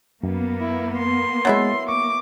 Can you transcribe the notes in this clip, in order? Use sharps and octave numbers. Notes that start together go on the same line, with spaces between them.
F#2 A#3 B3
E4
C6
F#3 G#3 E4 E5 A6
C#6 D6